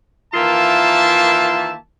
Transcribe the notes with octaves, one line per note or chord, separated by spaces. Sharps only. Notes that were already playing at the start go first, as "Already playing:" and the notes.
D#3 E3 A#3 F4 E5 A5